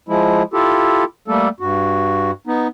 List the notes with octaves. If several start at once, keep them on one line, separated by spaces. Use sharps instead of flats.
F3 G#3 E4
E4 F4 G4 A4
G3 A3 A#3 A4
G2 F#4
B3 D#4